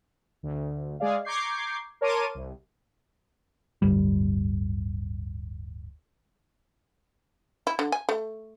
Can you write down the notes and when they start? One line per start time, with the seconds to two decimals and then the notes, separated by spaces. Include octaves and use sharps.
0.43 D2
1.00 G#3 G#4 D5 F5
1.25 A#5 C#6 D6 G6 G#6 C7
2.01 A#4 C#5 A5 C6 D6 D#7
2.35 C2
3.82 D1 G1 G3
7.67 E4
7.79 D3
7.92 G#5
8.09 A3